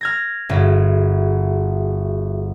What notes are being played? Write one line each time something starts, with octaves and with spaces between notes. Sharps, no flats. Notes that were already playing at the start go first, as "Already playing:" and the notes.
F6 G#6 A#6
G1 F#4 G#4 E5